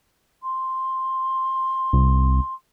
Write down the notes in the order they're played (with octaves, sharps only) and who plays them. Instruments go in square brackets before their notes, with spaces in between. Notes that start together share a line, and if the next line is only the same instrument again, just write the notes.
[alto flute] C6
[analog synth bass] C2